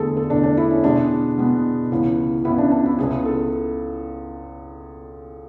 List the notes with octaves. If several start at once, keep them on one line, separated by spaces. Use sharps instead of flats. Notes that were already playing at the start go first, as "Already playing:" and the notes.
Already playing: E2 D3 A3 G#4 A4
A4
E2 D3 A3 D4
D4
E4
C#4
B2 G#3 B3 D4
B2 G#3 B3
C#2 C#3 E3 B3
C#2 C#3 E3 B3 E4
D4
D4
E4
C#2 C#3 G#3 B3 G#4
A4